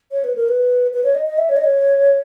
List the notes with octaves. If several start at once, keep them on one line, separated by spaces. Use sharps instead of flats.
C#5
B4
A#4
B4
B4
C#5
D#5
D#5
E5
C#5
D#5
C#5